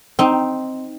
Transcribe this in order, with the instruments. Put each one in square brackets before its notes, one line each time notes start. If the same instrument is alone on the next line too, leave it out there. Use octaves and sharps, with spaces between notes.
[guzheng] C4 D#4